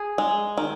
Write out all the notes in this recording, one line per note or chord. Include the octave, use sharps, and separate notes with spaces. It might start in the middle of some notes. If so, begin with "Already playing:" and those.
Already playing: G#4
G#3
D#3